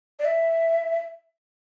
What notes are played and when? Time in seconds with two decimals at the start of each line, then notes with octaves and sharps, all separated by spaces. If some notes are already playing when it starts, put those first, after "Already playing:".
0.19 D5
0.25 E5